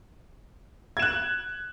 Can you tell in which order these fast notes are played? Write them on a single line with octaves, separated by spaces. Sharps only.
G#6 E7 F#6